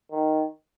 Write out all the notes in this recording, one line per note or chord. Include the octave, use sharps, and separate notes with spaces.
D#3